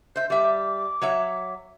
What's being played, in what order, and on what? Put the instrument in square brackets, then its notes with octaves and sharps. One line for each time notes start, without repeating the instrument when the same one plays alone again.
[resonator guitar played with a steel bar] C5 E5 [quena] G6
[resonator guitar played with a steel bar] G3 E5 [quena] D6
[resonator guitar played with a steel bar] F#3 C#5 E5